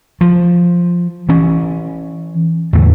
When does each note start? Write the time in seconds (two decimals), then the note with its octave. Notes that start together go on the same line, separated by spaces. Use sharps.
0.21 F3
1.29 E3 C#4
2.73 E2 A2 D3